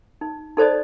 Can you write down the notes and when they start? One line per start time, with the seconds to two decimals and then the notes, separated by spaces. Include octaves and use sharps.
0.21 D#4
0.57 D#4 A4 C5 D5 D#5